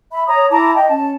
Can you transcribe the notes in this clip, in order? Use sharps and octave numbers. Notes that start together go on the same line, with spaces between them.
E5 B5
C#5 A#5 D#6
E4 A5 A#5 D6
D#5 G5
C#4 A5